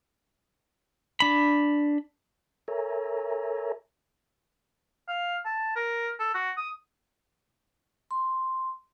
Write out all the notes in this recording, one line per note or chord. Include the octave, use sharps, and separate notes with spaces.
D4 B5
A4 A#4 C#5 E5 G#5 A#5
F5
A5
A#4
A4
F#4
D#6
C6